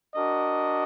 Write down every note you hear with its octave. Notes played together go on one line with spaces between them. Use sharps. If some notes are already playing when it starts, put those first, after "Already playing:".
D4 F#4 A#4 D#5